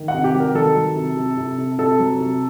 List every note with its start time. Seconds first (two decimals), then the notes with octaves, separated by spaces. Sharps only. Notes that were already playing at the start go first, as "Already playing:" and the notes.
Already playing: D#3
0.08 F#5
0.14 C3
0.24 G4
0.35 F#3
0.40 A#4
0.55 D#3 A4
0.76 F#3
0.96 C3
1.17 C3
1.37 C3
1.58 C3
1.78 C3 A4
1.99 F#3
2.20 C3